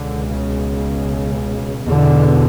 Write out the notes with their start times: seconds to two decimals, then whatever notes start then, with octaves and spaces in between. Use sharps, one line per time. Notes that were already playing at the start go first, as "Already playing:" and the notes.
Already playing: C#2 B2 D3
0.30 C#3
1.87 E2 B2 D3